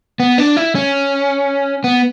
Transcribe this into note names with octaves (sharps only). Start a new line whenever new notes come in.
B3
D4
E4
C#4
B3